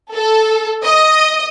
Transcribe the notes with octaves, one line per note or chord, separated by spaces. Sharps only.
A4
D#5